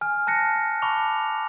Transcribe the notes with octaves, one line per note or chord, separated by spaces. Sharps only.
G#5 F6
A5 F#6 A#6 C#7
A5 B5 C#6 D6 F7